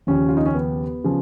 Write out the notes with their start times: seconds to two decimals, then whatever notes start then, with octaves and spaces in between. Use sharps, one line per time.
0.07 D#2 C#3 F3 C#4
0.29 F4
0.37 D#4
0.46 C#4
0.55 B3
1.04 C#3 F3